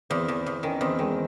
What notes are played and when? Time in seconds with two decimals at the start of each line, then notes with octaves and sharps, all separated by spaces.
0.10 E2 C4
0.28 E2
0.46 E2
0.63 D#3 C#4
0.81 E2 C4
0.99 D#3 G#3